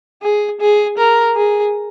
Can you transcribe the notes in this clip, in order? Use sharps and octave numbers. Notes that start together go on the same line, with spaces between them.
G#4
G#4
A#4
G#4